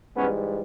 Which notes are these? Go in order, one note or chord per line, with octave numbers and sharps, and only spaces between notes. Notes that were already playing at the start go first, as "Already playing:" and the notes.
G#2 E3 G3 B3 C#4